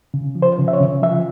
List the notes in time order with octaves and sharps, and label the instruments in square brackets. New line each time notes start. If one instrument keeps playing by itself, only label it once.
[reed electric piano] C#3
F3
C5
C#3
E5
C#5
C#3
F3 E5